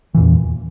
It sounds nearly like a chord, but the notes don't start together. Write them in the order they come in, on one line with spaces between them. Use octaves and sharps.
E3 A#2 E2